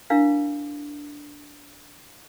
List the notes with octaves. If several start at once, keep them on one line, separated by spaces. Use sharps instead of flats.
D4 E4 A#4 F5